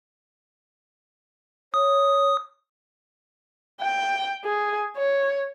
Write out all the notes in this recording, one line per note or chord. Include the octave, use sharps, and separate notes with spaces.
C#5 D#6
G5
G#4
C#5